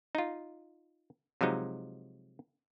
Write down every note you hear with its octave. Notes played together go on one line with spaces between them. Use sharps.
D#4 F4
C3 F3 F#3 G#3 D#4